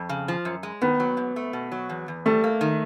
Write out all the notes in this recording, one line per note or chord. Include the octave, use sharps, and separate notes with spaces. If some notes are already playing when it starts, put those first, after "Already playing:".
Already playing: F2
C#3
F3
F#2
G#3
D#3 B3
F#3
G#2
A3
B2
F#3
E2
E2
G3 A3
A#3
D#3